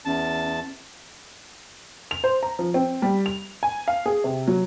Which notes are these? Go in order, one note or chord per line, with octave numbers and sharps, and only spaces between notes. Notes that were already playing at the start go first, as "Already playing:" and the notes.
E2 C#4 A5
F7
C5
A#5
F3
C4
G3
F7
G#5
F5
G#4
C3
F#3